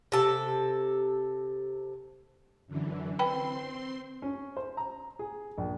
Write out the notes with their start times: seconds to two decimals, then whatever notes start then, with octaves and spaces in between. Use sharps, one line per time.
0.12 C3 A4
2.67 F#2 D3 E3
3.19 C4 B4 G5 B5 C6
4.22 C#4
4.57 C5
4.77 A#5
5.19 G#4
5.58 A#1